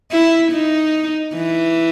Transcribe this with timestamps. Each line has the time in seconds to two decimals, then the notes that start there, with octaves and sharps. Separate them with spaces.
0.12 E4
0.52 D#4
1.34 E3